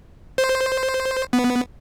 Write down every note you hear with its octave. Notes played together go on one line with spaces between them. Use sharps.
C5
B3